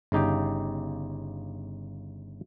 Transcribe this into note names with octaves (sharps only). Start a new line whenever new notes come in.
G1 C#3 D#4 G4 G5